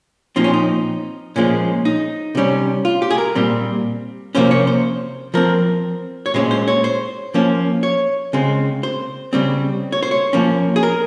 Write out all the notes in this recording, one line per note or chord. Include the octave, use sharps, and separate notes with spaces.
A#2 F3 C4 D#4
C#4
D#4
A#2 F3 G#3 C#4
D#4
C3 G3 C#4
F4
G4
G#4
A#4
A#2 G3 C4
C3 F3 A#3 C#4 C5
C#5
C5
F3 C4 A#4
C#5
A#2 G#3 C#4 C5
C5
C#5
C5
F3 A#3 C#4
C#5
C#3 G#3 C4
C5
C#3 G3 C4
C#5
C5
C#5
F3 A#3 C#4
G#4
A#4